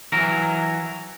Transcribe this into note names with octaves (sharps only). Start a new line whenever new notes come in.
E3 F#3 A#4